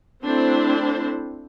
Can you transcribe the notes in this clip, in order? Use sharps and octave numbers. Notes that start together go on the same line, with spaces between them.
A3 C4 D4 E4 C5